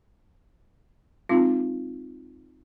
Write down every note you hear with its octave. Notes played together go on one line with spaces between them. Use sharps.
G#3 C4 D#4 F4